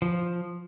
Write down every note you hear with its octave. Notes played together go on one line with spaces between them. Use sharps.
F3